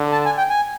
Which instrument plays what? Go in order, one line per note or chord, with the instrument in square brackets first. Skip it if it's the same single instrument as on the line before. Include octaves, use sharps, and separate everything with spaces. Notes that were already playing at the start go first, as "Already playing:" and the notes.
Already playing: [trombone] D3
[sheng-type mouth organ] A5
G#5
G5
G#5